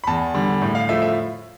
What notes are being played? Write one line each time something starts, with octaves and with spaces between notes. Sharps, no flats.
B5
E2 A5
D3 G3
A2
F5
F3 A3 E5
E5